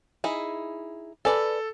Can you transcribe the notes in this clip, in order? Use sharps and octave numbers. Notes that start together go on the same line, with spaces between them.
D#4 E4 G#4
A4 B4 D5 G#5